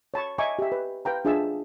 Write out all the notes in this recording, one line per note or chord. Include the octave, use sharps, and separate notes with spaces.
C#5 A5 B5 C#6
D#5 E5 G#5 A#5 C#6 D6
G4 E5
B4
B4 F5 G5 A#5
D4 F4 G#4 E5 A5 E6